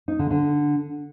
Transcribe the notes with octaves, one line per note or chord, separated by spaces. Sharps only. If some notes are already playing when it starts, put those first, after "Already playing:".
D#4
D3
D3